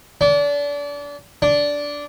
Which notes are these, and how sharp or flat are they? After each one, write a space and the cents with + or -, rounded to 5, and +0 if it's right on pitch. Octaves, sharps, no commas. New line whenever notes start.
D4 -30
D4 -10